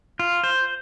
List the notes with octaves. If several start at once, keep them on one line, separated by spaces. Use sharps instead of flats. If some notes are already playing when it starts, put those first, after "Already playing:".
F4
C5